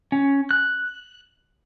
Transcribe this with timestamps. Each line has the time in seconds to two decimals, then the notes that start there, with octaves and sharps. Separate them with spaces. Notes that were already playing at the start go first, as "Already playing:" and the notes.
0.12 C#4
0.51 F#6